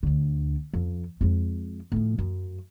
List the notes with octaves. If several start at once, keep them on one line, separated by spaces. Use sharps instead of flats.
D2 D3
F2
F2 G#3
A2 F3
F#2